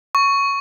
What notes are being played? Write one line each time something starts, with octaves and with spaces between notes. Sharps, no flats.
C#6